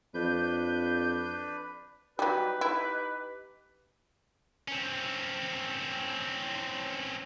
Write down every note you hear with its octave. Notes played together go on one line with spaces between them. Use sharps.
F2 D4 B4 G6
F#3 G3 D#4 G4 B4
E4
C4 C#4